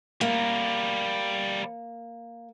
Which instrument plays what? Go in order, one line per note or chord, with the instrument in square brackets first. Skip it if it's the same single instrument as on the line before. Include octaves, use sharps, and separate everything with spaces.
[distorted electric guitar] G3 A#4 [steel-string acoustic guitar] A#3